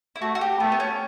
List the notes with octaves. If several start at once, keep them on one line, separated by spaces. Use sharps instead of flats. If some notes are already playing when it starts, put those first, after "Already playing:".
E4
A3 F#4
F#4
G4
A3 B3
B3
C#4